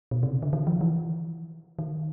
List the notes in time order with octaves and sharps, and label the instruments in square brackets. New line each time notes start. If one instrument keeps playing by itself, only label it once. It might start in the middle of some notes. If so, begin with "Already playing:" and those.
[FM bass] B2
C3
C#3
D3
D#3
F3
E3
D#3